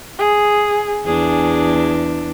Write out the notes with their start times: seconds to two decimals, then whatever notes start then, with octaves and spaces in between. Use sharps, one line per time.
0.19 G#4
1.06 E2 D4 G#4